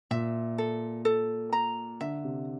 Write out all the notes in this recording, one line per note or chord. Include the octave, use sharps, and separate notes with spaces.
A#2 E5
A4
A4
A#5
D3 E5
C3